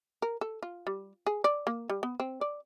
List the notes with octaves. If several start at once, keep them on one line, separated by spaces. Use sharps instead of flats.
A#4
A4
F4
G3
G#4
D5
A#3
G3
B3
C4
D5